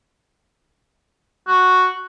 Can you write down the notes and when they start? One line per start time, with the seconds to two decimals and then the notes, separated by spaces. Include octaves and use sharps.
1.48 F#4